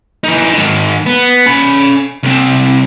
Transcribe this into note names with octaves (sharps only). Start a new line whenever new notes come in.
E3 D#4
G#2 D#3
B3
C#4 B5
C2 C4